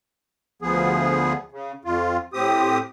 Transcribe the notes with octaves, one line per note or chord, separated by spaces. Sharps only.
D2 F3 B3 G#4
C#3
F2 F4
A2 C4 G4 D#6